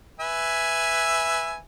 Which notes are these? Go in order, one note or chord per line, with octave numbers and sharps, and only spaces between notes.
B4 E5 G#5